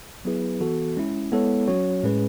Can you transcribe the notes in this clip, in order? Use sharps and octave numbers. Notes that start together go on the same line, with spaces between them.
F#3 B3 E4 G#4 B4
E3 B3 F#4 A4
G#3 C#4 E4
G#3 B3 E4 A4 C#5
F#3 C#4 F#4 C#5
A2 G#3 C#4 G#4 B4